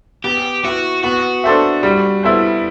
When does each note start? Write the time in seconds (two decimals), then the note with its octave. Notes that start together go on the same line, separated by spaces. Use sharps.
0.24 B3 G4
0.64 E4 F#4 B4
1.04 B3 F#4
1.44 D4 A4 C5 E5
1.83 G3
2.23 B3 E4 A4 C5